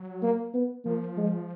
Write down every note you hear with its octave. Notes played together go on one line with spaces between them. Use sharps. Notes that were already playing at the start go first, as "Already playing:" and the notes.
Already playing: F#3
A#3
B3
F3 A#3
G#3